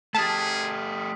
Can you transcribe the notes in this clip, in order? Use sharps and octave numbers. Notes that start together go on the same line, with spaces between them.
A3 G4 G#4 A5 D#6 F6 B6